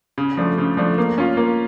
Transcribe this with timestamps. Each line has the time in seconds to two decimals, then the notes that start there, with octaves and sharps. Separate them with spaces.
0.18 C#3
0.37 F3 A3 D4
0.58 C#3
0.77 F3 A3 D4
0.98 A#3
1.18 C#4 F4
1.37 A#3